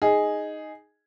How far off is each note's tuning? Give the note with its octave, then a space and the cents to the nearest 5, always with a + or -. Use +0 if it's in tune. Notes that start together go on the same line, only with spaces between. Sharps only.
D#4 +0 G#4 +0